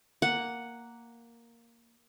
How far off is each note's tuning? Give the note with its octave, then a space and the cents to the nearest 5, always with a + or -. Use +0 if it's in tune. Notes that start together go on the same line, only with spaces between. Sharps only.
A#3 +0 F#5 +0